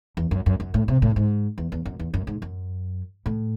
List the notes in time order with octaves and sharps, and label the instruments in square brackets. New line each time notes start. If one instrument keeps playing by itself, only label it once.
[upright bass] E2
F#2
F#2
F#2
A2
C3
A2
G#2
E2
E2
F#2
E2
F#2
G#2
F#2
A2